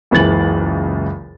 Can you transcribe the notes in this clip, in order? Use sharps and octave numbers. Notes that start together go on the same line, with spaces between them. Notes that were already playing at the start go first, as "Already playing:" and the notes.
F#1 C#2 E3 G#4 A6 F#7